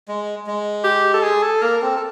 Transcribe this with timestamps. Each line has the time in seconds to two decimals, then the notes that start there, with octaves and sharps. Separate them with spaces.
0.08 G#3
0.47 G#3
0.84 G4
1.14 A4
1.23 G#4
1.42 A4
1.62 A#3 A#4
1.81 C4 A4
1.96 A4